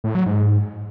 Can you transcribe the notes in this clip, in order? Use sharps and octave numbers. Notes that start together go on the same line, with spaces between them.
A2
F#3
G#2